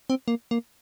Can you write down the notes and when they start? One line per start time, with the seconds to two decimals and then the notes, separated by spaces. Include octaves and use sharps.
0.10 C4
0.28 A#3
0.51 A#3